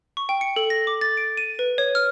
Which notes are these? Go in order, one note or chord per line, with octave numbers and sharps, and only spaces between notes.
C#6
G5
C#7
A4
A#6
D6
A6
D7
D#7
B4
C#5
F6